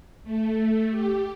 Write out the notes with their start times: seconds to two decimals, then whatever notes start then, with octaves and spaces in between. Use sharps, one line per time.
0.23 A3
0.91 G4